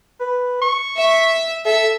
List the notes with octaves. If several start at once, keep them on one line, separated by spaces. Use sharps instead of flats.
B4
C#6
E5
A4 E5